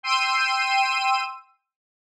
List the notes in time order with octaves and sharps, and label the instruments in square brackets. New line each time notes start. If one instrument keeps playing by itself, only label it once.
[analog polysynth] G5 C6 E6 D#7